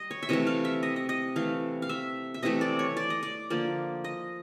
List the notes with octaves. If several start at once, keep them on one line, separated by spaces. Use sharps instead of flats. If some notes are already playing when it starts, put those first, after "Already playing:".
Already playing: G3 D#5
C#5
E5
C3 E3 A3 D#5
F5
E5
D#5
D#5
D#5
E3 A3 F5
F5
E5
E5
C3 E3 A3 D#5
D5
C#5
D5
D#5
D5
D3 F3 A#3 D5
D#5